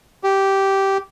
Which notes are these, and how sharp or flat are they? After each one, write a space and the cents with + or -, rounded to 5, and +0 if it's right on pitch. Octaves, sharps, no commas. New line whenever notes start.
G4 -10